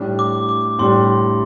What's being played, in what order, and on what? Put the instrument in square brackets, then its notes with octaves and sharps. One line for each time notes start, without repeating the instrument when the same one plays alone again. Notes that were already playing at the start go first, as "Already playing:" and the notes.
Already playing: [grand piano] A2 G3 D4
[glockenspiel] D6
D6
[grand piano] A2 G3 D4 [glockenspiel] C6